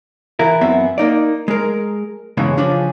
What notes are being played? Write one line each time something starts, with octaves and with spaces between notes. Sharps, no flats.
E3 E4 A#4
F#2 B3 C4 E5
A#3 D#4 D5
G#3 A#4
E2 G2 C#3 E3 G#3
C#3 F3 C#4 D4 F4